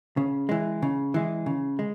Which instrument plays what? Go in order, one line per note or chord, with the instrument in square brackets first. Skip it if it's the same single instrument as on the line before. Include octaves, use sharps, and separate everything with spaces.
[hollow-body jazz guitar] C#3
E3 G#3
C#3
E3 G#3
C#3
G#3